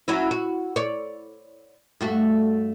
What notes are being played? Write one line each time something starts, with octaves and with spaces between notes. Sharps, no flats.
F#3 C#4 E4
F#4
C#5 D5
G2 A3 F#4